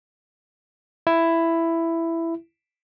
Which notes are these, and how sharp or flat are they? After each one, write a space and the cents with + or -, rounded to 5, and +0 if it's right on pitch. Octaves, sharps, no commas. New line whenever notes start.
E4 +10